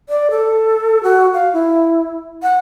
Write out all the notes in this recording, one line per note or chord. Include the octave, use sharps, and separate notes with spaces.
D5
A4
F#4
F5
E4
F#5